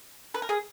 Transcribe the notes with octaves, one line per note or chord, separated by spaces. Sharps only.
B4
A#4
G#4